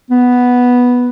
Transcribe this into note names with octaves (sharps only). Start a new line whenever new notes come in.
B3